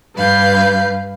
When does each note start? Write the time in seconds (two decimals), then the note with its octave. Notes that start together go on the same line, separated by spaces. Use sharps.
0.16 G2 B4 F5 G6